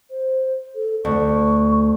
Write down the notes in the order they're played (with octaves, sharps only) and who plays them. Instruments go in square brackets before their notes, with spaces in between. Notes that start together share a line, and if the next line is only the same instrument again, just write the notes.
[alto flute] C5
A4
[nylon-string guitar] D2 [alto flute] C#6